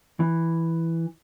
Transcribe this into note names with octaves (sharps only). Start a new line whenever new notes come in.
E3